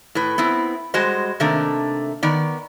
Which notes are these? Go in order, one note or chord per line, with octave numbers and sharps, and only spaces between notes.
A2 B4
B3 C4 E4
G3 G#3 F#4 C5 D#5
C3 D#3 A3 A#3 D4
D#3 B3 D5